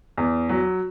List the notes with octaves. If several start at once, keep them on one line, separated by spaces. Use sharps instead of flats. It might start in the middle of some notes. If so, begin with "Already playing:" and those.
E2
F#3